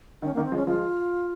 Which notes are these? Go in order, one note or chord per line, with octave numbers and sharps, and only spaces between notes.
D#3 C#4
D#3 A#3
C4
F3 G#3
C#4
F3 G#3 F4